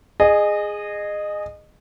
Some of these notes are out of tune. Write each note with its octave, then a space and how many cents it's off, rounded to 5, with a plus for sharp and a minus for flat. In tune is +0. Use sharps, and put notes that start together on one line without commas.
G#4 +0 D#5 -25